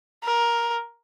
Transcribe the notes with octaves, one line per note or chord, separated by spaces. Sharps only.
A#4